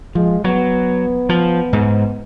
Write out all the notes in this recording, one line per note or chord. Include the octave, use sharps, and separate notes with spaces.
F3 G#3
F#3 B3
F3
G#2